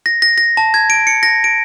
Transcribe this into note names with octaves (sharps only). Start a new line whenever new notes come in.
A#6
A#6
A#6
A5
G#6
D7
C#7
A#6
D7